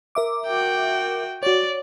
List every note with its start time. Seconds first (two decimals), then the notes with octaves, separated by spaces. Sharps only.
0.15 A#4 E5 D6
0.47 F#4 G5
1.43 F#4 C#5 D5